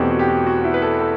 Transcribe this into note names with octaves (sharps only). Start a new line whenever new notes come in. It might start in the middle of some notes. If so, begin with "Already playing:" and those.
Already playing: E2 B2 A3 C4 G4
F#4
G4
F#4
F#4
E4
B4
A4
A4